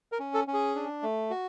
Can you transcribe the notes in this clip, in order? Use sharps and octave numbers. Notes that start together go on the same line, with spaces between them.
A#4
C#4
A4
C#4
G#4
D4
A3
F#4